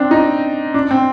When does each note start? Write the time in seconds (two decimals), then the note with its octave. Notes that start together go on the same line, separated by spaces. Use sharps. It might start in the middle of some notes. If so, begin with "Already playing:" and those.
Already playing: C4 D4
0.11 D#4
0.74 D4
0.91 C4